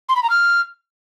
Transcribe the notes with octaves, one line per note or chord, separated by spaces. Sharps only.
C6
B5
A#5
F6